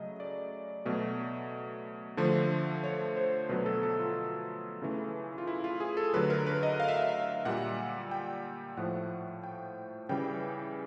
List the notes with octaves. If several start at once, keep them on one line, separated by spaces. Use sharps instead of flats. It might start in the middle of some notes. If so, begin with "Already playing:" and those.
Already playing: C#3 F#3 A3 D#5
D5
B2 F#3 A3
D3 F3 A3
C#5
C5
B2 F#3 A3 B4
A4
A4
F4
C#3 E3 A3
F4
E4
F4
G#4
A4
D3 F#3 A3 B4
A#4
B4
D#5
F5
E5
F5
A#2 G3 F#5
G5
A2 F3 A3 F#5
G5
C#3 E3 G3 G5